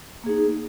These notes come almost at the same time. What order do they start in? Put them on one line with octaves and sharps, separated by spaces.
A#3 G#4 D#4